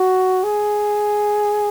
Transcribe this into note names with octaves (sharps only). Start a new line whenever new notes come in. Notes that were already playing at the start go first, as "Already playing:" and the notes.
Already playing: F#4
G#4